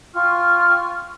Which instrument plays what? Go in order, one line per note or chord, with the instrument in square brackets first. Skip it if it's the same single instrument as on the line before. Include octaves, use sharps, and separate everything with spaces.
[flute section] F4 G5 C#6 F6